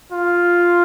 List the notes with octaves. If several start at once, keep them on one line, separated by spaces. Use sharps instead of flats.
F4